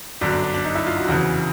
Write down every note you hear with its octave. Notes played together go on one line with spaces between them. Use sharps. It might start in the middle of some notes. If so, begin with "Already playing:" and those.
G1 F#2 D3 F#3 D4
D4
D4
D4
D#4
E4
F4
F#4
F1 E2 C#3 E3 F#4